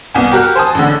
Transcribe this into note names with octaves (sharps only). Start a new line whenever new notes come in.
C2 B3 G#5
F#4 G4 A#4 F6 F#6
C5 G#5 A5 D#6
A1 D3